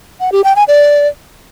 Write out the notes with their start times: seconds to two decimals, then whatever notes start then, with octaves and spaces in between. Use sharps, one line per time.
0.20 F#5
0.32 G4
0.44 G5
0.56 G#5
0.68 D5